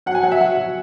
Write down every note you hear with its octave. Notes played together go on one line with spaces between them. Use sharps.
F#3 F#5
G#5
F#3 F#5
E5
F#3 F#5
F#3